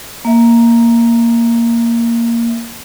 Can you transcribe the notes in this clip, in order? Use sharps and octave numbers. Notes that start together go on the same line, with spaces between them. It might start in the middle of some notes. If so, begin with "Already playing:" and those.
A#3 E5